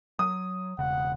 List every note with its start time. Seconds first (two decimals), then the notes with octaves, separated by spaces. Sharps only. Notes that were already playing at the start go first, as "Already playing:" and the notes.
0.19 F#3 D#6
0.79 E1 C#3 F#5